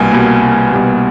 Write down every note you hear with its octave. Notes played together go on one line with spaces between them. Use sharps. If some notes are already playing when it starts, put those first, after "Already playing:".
Already playing: C2 B2 G3 A#3 G#5
B2 G3 A#3
C2
B2 G3 A#3